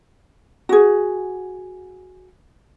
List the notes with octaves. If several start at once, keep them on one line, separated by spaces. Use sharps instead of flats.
F#4 G#4